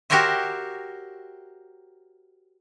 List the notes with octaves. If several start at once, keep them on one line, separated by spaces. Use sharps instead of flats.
F#4 G4 A#4 C5 C#5 E5